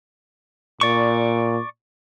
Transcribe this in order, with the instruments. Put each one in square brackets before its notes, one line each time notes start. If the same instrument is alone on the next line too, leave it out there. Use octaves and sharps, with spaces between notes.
[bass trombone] A#2 [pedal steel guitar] D5 C#6